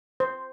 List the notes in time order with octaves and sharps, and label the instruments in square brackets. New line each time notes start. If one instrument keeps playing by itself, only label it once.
[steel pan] C5